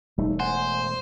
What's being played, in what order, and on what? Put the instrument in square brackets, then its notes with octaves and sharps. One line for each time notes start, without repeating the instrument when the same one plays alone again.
[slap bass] E1 A3 [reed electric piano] G3 D#4
[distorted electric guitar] C5 [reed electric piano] F#5 G#5